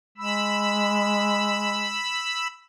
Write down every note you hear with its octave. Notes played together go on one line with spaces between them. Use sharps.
G#3 B5 E6